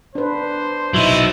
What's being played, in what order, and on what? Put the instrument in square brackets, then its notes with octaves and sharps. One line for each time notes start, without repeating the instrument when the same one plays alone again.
[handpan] D4 B4 [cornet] C5
[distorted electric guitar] F#3 D#4 [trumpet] E4